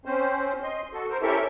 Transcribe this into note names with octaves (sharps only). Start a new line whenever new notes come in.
C4 C#4 C5
D#5 C6
F#4 A4
A#4 C5
C#4 E4 G4 A4 A#4 E5